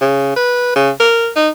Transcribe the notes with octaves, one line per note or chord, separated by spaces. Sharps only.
C#3
B4
C#3
A#4
D#4